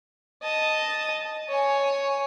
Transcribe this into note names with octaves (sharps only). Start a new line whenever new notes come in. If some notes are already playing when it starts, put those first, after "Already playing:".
D#5 A5
C#5 G#5